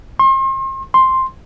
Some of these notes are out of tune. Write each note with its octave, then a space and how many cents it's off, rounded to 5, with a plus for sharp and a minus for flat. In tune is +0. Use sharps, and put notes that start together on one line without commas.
C6 +40
C6 +5